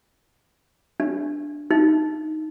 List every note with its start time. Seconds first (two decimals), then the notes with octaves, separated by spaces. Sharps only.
1.00 D4
1.71 D#4